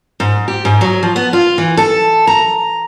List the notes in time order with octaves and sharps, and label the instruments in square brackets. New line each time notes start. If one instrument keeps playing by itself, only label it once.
[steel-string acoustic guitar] G#2
G4
G#2
F#3
F3
B3
F4
E3
A4
A#5